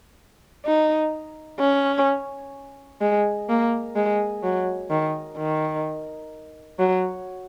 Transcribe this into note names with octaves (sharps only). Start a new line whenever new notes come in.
D#4
C#4
G#3
A#3
G#3
F#3
D#3
D#3
F#3